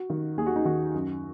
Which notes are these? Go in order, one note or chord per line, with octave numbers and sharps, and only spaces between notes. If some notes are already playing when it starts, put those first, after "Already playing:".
Already playing: F#4
D#3
D#2 G#4
F#4
D#4
D#3 F#4
F#2